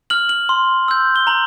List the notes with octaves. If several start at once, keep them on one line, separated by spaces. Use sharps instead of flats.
F6 F#7
F#7
C6
E6 G6
G7
A#5 F#7